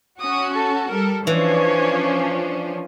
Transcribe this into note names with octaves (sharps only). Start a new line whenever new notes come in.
C#4 F#4 D#6
A4
G3 A4 A#4
E3 F3 C#4 D4 C#5